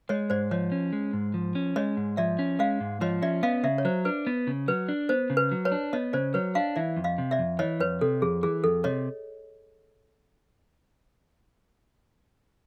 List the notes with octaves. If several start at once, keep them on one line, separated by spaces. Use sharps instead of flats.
G#3 C#5 D#5
G#2 C5 D5
F3 C#5 D#5
C#4
G#3
G#2
F3
C#4
G#3 C#5 D#5
G#2
F3 D5 E5
C#4
G#3 D#5 F5
G#2
F3 C#5 D#5
C#4 D5 E5
B3 D#5 F5
C#3 D5 E5
C#5
F#3 C5
D4 B4
B3
C#3
F#3 B4
D4
B3 C5
C#3
B4
F#3
B4 C#5
D4
B3 C#5 D#5
C#3 C5 D5
F#3 B4 C#5
D4 D#5 F5
E3 D5 E5
F2
D#5 F5
C3
D5 E5
F2
E3 C#5 D#5
F2 B4 C#5
C3 A4
F2 G#4
E3 G#4
F2 A4
C3 C#5 D#5